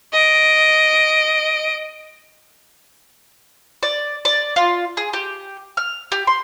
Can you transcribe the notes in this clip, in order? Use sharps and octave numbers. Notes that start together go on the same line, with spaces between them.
D#5 D7
D5
D5
F4
G#4
G4
F6
G4
C6